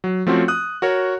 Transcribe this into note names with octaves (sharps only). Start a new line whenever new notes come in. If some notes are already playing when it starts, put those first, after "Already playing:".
F#3
F3 A3 C4 C#4 F4 F#4
D#6 F#6
F#4 A#4 C#5